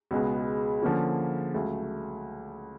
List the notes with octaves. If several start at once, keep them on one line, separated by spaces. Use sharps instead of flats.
C#2 B2 G#3 B3
D3 F3 A#3 C#4 F4
C#2 C#3 F#3 A3